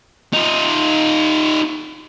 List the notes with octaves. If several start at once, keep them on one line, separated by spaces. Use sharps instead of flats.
D#4 F4